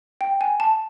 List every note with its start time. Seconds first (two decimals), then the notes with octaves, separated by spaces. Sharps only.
0.21 G5
0.41 G#5
0.60 A5